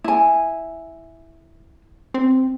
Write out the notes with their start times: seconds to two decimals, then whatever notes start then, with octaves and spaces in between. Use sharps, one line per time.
0.04 E4 G#5
2.14 C4